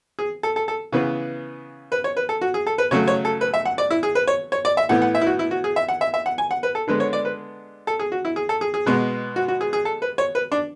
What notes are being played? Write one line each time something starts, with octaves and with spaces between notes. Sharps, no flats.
G#4
A4
A4
A4
C#3 E3 B3 B4
B4
C#5
B4
A4
F#4
G#4
A4
B4
C#3 F#3 A3 C#5
C#5
A4
B4
E5
F#5
D5
E4
G#4
B4
C#5
C#5
D5
E5
A2 E3 B3 F#5
F#5
E5
E4
F#4
E4
F#4
G#4
E5
F#5
E5
E5
F#5
G#5
F#5
B4
A4
D3 G#3 B3 B4
C#5
D5
B4
A4
G#4
F#4
E4
G#4
A4
G#4
G#4
B2 G#3 B3
F#4
F#4
G#4
G#4
A4
B4
C#5
B4
D4